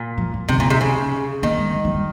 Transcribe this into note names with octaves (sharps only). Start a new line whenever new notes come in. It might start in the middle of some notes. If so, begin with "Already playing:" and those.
Already playing: A#2
F3
F3
C3 D#3
A#2 F3
D#3
C3
C#3
D#3 A#3
G#3
G3
F3
G3